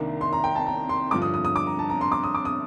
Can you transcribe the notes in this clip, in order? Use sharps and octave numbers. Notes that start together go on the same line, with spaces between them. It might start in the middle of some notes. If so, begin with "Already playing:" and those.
Already playing: C2 C3 D#3 A#3 D4
C6
A#5
G5
A5
A#5
C6
G2 D3 F3 D6
D#6
D#6
D#6
D6
A#5
A5
A#5
C6
D6
D#6
D6
D#6